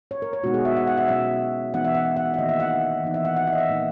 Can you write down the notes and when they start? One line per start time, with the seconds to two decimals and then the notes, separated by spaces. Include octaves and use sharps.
0.11 C#5
0.22 A#4
0.33 C#5
0.43 B2 G#3 B3 D#4 F#4
0.54 G#4
0.65 E5
0.77 F#5
0.87 F#5
0.97 E5
1.08 B2 F#3 C#4 E5
1.74 E3 B3 D#4 F#5
1.85 E5
1.95 F#5
2.16 F#5
2.34 E5
2.38 D#3 A#3 D#4 D#5
2.49 E5
2.60 F#5
3.04 E3 B3 D#4
3.14 E5
3.25 F#5
3.36 F#5
3.47 E5
3.53 D#5
3.58 E5
3.68 A#2 A#3 D#4